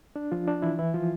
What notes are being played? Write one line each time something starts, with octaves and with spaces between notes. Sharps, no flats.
D4
F3 F4
D4
E3 E4
E3 E4
F3 F4